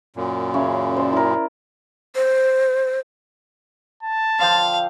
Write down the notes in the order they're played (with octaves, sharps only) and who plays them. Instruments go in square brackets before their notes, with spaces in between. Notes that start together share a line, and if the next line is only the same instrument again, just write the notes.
[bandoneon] F#2 A#2
[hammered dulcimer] C#3 C#5 E5
C5 D5
E4 A#4
[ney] C5
[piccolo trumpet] A5
[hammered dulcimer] D3 F3 G5 [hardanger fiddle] F5